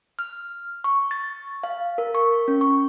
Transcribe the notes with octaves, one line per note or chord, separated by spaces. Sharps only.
F6
C#6
A6
F5
A#4
C#6
C#4
C#6